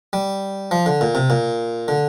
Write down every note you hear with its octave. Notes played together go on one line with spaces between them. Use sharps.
G3
F3
D3
A#2
C3
A#2
D3